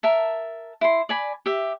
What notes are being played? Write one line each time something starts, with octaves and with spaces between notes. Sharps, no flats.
A#4 E5 A5
E4 C6
D5 G#5 B5
G4 E5